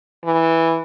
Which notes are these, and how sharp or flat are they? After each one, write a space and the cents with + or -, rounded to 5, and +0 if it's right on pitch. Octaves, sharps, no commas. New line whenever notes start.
E3 -5